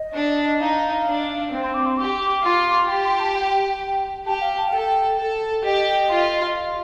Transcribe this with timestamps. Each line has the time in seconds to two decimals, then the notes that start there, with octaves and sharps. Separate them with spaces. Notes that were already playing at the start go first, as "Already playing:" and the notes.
Already playing: D#5
0.14 D4
0.60 D#4 F5
1.05 D4
1.51 C4 F5
1.63 C6
1.74 D6
1.86 C6
1.97 G4 D6
2.43 F4
2.89 G4 C6
3.04 C6
3.20 A5
3.35 G5
4.26 G4 A5
4.34 G5
4.42 F5
4.57 A5
4.68 F5
4.72 A4 G5
5.18 A4
5.64 G4 D#5
6.10 F4
6.56 F5